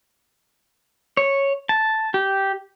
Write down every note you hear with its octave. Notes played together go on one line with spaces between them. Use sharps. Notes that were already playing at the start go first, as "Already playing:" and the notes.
C#5
A5
G4